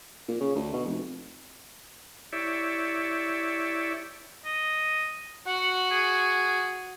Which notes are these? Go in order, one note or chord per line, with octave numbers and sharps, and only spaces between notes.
A#2
C#3
D2
B2
F1
E4 G4 C#5 D5 E5
D#5
F#4 F#5
G#4